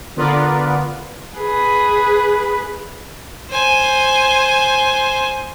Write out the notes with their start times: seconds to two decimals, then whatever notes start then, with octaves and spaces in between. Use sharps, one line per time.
0.16 D3 B3 F4 A#4 B4 D5
1.37 G#4 B4
3.50 C5 G#5